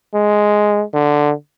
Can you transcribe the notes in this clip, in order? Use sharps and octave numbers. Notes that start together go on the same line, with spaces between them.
G#3
D3